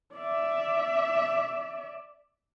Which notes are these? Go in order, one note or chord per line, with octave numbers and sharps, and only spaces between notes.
D5 E5